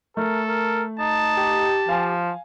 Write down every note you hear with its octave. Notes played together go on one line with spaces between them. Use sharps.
A3 A4 A#4
A#4
D#4 A5
G4
F3 F5 G#5